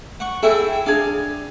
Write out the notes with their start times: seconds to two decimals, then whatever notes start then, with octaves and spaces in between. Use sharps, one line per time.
0.20 F#5 C#6
0.43 E4 G#4 A4 E5 G5
0.86 D4 G#4 F5